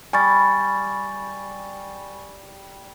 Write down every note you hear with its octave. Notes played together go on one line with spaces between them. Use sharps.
G3 G#5 C#6 A6